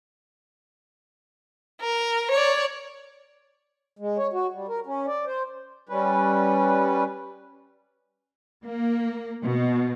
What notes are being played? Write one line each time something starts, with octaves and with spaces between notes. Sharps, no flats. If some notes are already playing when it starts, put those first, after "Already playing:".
A#4
C#5 D5
G#3
C#5
F#4
G3
A#4
C#4
D5
C5
G3 C#4 B4
A#3
B2